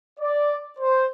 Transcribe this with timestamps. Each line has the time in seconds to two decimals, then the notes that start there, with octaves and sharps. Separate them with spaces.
0.19 D5
0.79 C5